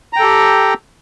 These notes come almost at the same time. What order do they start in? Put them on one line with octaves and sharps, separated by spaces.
A#5 G5 A4 G4